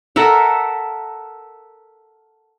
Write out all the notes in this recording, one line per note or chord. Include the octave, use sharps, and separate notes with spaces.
A4 A#4 E5 F#5